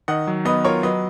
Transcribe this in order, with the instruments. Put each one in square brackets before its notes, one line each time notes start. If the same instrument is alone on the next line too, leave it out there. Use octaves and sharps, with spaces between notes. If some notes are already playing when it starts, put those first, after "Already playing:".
[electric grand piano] D#3 [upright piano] D#5 F#5
[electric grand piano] F#3
[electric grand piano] B3 [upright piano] B4 D#5
[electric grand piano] F4 [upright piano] A#4 C#5
[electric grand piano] F#3 [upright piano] B4 D#5